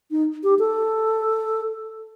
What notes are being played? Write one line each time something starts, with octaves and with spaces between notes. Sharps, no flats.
D#4
G4
A4